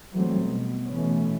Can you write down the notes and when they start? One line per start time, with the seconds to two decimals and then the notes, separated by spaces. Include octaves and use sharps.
0.14 E3 F#3 G3 A3 C4
0.43 B2
0.89 B2 E3 A3 B3 C#4